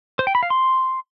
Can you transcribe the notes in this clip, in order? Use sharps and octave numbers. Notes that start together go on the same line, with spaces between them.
C5
G5
B5
F5
C6